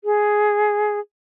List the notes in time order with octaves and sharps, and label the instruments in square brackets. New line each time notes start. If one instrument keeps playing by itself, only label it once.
[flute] G#4